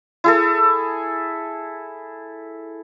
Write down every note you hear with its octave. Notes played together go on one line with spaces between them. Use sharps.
E4 G#4 A4